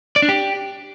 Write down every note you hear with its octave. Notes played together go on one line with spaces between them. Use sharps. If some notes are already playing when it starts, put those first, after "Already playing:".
D5
D4
G4